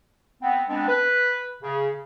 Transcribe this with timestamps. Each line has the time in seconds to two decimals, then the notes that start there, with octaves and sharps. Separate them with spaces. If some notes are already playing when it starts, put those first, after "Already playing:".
0.42 B3 C4
0.69 G#3 B3 C4 D4
0.88 B4
1.63 C#3